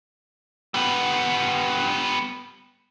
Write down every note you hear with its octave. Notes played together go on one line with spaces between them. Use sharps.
G3 B3